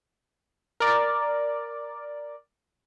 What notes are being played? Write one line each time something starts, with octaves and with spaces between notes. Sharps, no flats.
A#4 D5